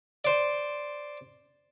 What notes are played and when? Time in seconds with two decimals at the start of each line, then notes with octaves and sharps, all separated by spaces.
0.25 C5 D5